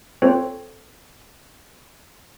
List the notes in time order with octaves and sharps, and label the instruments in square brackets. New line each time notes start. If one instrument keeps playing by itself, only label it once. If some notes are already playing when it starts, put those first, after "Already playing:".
[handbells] C4 F4 A4 C5 C#5